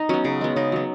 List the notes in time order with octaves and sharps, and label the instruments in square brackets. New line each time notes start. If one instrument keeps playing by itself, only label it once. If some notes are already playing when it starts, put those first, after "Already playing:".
Already playing: [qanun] D#4
F#3 B3 C#4
C#3
G#3 B3
C#3 D#4
F#3 B3